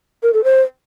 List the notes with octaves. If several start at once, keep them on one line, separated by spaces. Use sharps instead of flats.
A#4
A4
C5